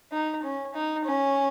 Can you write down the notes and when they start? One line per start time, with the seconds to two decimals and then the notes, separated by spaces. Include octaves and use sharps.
0.12 D#4
0.43 C#4
0.75 D#4
1.05 C#4